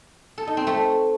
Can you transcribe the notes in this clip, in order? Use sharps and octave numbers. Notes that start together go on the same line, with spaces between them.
A4
D#4
C4
A3